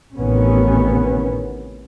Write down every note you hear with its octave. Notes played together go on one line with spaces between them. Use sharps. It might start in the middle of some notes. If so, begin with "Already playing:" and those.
A1 A2 C3 D#3 B3 C#4